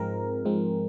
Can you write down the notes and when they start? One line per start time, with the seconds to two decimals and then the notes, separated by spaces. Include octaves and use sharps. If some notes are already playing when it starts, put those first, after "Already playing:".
Already playing: G#2 F3 G#3 C4 A#4
0.45 G#2 F3 G#3 C4